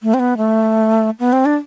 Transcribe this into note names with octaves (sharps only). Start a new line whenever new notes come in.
A3
C4
B3
A3
B3
C4
D4